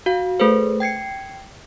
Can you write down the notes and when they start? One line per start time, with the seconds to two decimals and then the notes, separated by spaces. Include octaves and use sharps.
0.06 F#4 F5
0.40 A3 G#4 A4 B4 C5
0.80 G5 G#6 C7 C#7